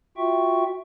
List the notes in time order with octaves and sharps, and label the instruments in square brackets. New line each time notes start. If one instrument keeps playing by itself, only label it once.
[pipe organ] F4 F#4 E5 G5 C#6